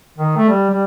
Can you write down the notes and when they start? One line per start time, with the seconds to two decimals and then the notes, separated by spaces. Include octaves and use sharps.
0.19 D#3
0.37 A3
0.49 G3
0.71 G3